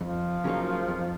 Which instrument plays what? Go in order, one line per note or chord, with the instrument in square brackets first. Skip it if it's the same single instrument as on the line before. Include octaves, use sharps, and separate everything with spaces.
[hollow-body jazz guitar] F2 [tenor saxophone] F3
[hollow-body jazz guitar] C#3 F#3 A#3 D#4
F2